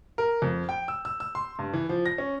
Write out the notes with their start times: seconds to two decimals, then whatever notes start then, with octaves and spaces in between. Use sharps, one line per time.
0.18 A#4
0.42 F2
0.69 G5
0.88 E6
1.05 E6
1.20 E6
1.35 C6
1.59 G2
1.73 E3
1.89 F3
2.06 A#6
2.18 C#4